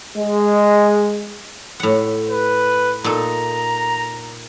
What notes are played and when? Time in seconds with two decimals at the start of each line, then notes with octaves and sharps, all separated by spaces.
0.17 G#3
1.80 A2 F#5
2.29 B4
3.04 A#2 D#4 A4 A#5